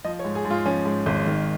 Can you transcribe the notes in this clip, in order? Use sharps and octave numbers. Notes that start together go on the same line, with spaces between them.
F3 D#5
C#5
G#2
G#4
G#2
F4
F3 C#4
G#2
G#1
D#3